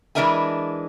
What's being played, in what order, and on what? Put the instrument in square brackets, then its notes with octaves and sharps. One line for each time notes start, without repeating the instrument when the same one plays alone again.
[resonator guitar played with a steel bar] E3 G#3 D4 A#4 E5 G#5